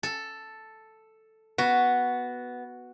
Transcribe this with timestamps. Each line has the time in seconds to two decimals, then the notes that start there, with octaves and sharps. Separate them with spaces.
0.03 A4
1.58 B3 F#4